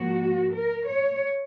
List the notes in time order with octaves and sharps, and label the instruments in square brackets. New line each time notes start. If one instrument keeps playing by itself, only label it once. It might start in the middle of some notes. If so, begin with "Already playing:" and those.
Already playing: [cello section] G#2 F3 A#3 F#4
A#4
C#5